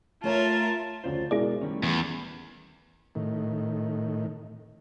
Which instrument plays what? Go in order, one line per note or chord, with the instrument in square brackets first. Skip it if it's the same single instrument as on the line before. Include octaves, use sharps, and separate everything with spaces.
[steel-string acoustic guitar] A3 C#5 A#5 [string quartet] F4 A#4 E5 [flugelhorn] A5
[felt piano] D2 C#3 F3 [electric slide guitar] C5 D5
[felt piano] B2 G#3 [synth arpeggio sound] E4 G#4 D5 [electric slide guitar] A#4
[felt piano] D#3 [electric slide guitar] G3 A3 C#4
[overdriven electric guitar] E2
[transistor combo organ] A2 D#3